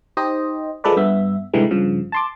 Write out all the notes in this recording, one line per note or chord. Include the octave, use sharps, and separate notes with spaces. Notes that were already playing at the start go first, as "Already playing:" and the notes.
D#4 G4 C5 D#5
F3 G#3 A4 B4 D5
G2 B3 E5
C2 G#2 D3 E3 G3 G#3
G2 C#3 F3
A5 C6 D6